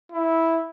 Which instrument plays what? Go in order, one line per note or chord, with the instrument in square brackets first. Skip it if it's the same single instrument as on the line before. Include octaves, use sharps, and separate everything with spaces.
[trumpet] E4